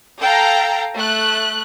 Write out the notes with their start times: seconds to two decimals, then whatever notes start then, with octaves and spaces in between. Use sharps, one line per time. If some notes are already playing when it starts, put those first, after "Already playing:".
0.19 A4 F5 G5 A#5
0.96 A3 F#6